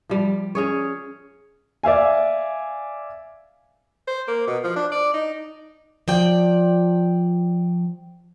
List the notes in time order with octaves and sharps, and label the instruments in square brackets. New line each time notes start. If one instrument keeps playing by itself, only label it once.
[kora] F3 G3
C#4 G#4 C#5
[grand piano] D5 E5 F5 G#5
[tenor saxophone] C5
A#3
B2
F3
D4
D5
D#4
[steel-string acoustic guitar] F3 D5 G5